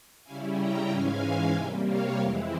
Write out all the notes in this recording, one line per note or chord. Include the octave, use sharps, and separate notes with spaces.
C#3 G3 C#4 E4 F5 G#5
G5 A#5
G#2 E3 G#3 C#4 F5 G#5
C3 G3 A#3 E5 G5
C#5 F5
F2 E3 G#3 C4 E4 G4